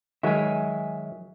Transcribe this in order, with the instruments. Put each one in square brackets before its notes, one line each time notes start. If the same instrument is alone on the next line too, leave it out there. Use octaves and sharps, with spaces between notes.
[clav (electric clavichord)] D#3 F#3 G#3 [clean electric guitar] E5 G#5